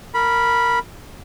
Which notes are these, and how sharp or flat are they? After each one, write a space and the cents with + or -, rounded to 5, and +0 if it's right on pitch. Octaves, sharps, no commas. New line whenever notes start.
A#4 -10 B5 -15